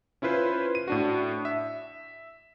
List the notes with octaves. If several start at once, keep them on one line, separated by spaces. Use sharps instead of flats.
C#4 E4 F4 B4 C5
D#7
A2 D4 F#4
E5